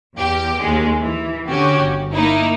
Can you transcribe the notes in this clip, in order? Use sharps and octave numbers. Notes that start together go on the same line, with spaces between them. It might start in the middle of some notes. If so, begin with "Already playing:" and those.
E2 G4
D#2 G#3
E3
D3 C#4 F#4 G4
G1
A#3 D#4 E4